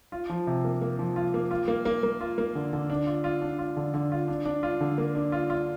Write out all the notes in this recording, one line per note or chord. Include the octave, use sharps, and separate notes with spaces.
F4
F3
C3
A#3
A#3
F3
F4
A#3
F4
A#3
A#3
A#3
F4
A#3
D3
D3
D4
F4
F4
D4
F4
D3
D3
F4
D4
D4
F4
D3
A#3
D4
F4
F4